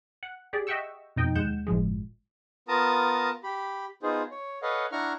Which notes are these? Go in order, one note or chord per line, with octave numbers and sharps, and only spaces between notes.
F#5
G4 G#4 D5
D#5 E5 F#5 G5 C#6 E6
F2 B2 D#4 D#5 G5
D#2 G#3 F#5 G6 E7
G1 A2 F3 G#3
B3 F4 A#4 A5 A#5 D#6
G4 B5
B3 D#4 F4 G#4 C5
C#5
A4 B4 C#5 D#5 F5 F#5
D4 E4 F#5 A#5 C#6 F6